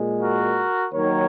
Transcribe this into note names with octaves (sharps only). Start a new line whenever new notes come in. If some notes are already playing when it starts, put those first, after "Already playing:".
Already playing: A#2 G#3
F#4 A#4
D#2 D#3 F#3 A#4 C#5